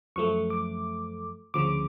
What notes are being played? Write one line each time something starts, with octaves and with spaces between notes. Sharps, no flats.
F#2 F3 A3 C#6
D6
D2 C#3 F3 D6